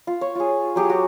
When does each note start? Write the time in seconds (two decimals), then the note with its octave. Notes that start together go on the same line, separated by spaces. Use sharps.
0.07 F4
0.21 C#5
0.35 F4 G#4
0.76 F#3 G4 G#4
0.90 F#4